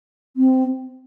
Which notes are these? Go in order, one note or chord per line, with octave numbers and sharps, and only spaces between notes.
C4